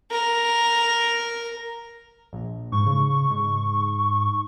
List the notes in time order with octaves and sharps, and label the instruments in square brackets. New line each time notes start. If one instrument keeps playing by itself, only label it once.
[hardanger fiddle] A#4
[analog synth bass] A#1
[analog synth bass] G#2 [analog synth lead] C#6
[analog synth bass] C#3
G#2